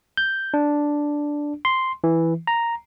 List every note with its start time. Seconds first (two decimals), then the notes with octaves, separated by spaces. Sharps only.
0.17 G6
0.54 D4
1.65 C6
2.04 E3
2.47 A#5